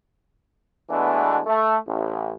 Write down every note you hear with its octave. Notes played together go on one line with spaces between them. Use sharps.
B2 E3 G#3 A3 B3 D4
A3
A1